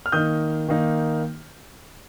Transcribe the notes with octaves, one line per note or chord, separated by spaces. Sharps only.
F6
D#3 A#3 D#4 D#6 G6
D#3 A#3 D#4